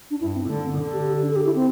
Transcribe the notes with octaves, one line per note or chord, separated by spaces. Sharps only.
D4
G2 E4
C4
D3 A3
C4
D3 D4
G4
G4
D4
A4
G4
E4
C4